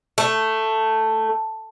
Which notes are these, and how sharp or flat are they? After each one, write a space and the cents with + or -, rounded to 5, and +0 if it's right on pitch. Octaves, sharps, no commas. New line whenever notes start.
A3 +5